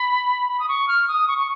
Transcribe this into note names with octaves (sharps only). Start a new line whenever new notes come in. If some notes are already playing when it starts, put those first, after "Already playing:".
Already playing: B5
B5
D#6
C#6
F6
D#6
C#6
C#6